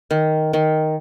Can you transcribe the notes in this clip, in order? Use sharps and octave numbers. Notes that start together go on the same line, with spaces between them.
D#3
D#3